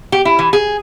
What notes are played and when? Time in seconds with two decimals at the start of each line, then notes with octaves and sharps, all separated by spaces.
0.12 G4
0.25 E4
0.39 E3
0.53 G#4